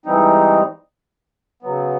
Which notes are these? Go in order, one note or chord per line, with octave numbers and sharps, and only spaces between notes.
G#2 E3 G3 C4 D#4
C#3 F#3 B3